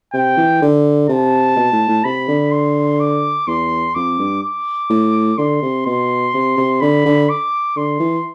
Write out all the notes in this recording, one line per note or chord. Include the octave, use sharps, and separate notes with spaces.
C3 G5
E3
D3
C3 A5
B2
A2
A2
C3 B5
D3
C6
D6
E2 C6
F2 D6
G2
D6
A2
D3 C6
C3
B2 C6
C3
C3
D3 B5
D3
D6
D3 C6
E3